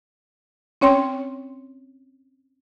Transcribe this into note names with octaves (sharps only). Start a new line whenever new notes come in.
C4 C#4 C#5 G5 C6